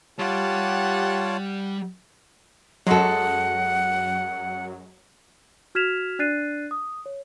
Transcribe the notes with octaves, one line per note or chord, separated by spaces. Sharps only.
G3 F4 G4 C#5 F#5 A5
F#2 F#3 G#3 A4 F#5
F#4 F6 G#6 B6 E7 F7
D4 D5 F#6 A6 C7 D#7
D#6
C#5